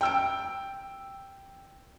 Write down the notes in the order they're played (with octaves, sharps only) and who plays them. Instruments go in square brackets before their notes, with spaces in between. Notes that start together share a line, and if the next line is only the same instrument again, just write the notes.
[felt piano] G5 E6 D7